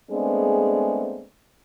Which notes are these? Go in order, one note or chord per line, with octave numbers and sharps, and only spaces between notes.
G#3 A3 B3 C4 D4 G#4